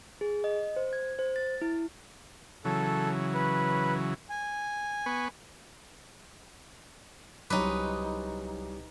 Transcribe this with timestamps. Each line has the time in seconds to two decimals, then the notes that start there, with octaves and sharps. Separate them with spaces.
0.21 G#4
0.44 D#5
0.76 C5
0.93 G#6
1.19 C5
1.36 A6
1.62 E4
2.65 C#3 E3 F#3 A4
3.35 B4
4.30 G#5
5.06 B3 B4 C#6
7.50 C2 F#3 C#4 D#4 B4 D6